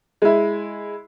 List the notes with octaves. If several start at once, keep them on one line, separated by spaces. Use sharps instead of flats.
G#3 E4